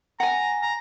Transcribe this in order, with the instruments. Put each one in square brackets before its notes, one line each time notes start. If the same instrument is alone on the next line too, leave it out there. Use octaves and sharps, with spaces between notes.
[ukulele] F#5 G#5 [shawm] A#5
[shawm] A#5